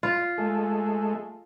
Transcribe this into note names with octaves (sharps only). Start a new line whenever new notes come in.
F4
G#3 A3